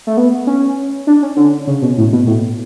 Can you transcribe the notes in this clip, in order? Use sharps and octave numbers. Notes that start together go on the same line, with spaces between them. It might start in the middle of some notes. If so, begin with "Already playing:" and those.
A3
B3
C#4
D4
C#4
D3
C#3
B2
A2
B2
A2